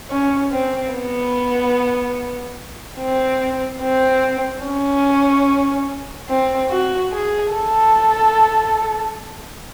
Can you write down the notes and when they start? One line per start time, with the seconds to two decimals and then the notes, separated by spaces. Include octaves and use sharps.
0.10 C#4
0.52 C4
0.93 B3
2.99 C4
3.81 C4
4.64 C#4
6.29 C4
6.70 F#4
7.12 G#4
7.53 A4